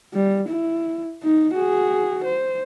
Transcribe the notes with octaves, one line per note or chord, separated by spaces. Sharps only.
G3
E4
D#4
F#4 G#4
C5